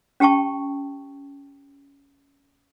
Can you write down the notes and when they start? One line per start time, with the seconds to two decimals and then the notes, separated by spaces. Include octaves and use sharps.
0.20 C#4 G4 G5 A5 C#6